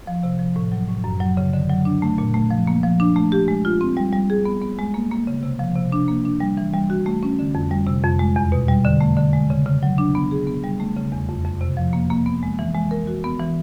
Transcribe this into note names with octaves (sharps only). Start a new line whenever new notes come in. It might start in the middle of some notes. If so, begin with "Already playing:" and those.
F3
C3
F3
A2
F#3
A2
F#2
F#3
C#3
D3
F#3
D4
A3
A#2
A3
F3
A#3
F3
D4
A3
G4
G#3
F4
C4
G3
G3
G#4
B3
B3
G#3
A#3
A#3
C#3
C3
F3
C3
D4
A#3
D4
G3
E3
G3
F#4
A3
C#4
D3
F2
G3
C3
F2
G#3
E2
B2
G3
D3
A3
D3
G#3
C#3
C#3
F#3
D4
B3
G#4
B3
G3
A3
C#3
E2
F2
F2
C3
F3
A#3
A#3
B3
G#3
E3
G#3
A#4
F#4
B3
E3